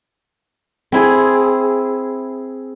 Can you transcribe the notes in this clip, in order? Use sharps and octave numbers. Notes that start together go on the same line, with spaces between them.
C4 E4 G#4